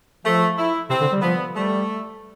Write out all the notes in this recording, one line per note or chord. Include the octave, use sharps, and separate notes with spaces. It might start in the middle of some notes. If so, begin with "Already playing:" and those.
F3 A3
E4
C3 C4
D3
G3
F3 B3
G3 A3